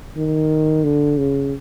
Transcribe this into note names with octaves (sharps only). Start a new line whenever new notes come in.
D#3
D3
C#3